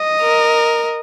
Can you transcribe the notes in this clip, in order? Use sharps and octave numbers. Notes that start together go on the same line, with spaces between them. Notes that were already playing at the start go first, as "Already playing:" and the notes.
Already playing: D#5
A#4